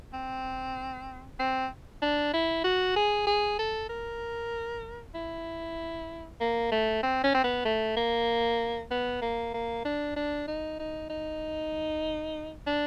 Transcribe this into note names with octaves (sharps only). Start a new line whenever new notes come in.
C4
C4
D4
E4
F#4
G#4
G#4
A4
A#4
E4
A#3
A3
C4
C#4
C4
B3
A3
A#3
B3
A#3
A#3
D4
D4
D#4
D#4
D#4
D4